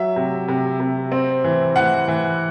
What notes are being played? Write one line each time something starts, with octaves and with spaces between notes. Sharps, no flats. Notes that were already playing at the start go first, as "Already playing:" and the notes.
Already playing: F#3 E5
C3
C3
C3
C4
E3
E3 F#5
E3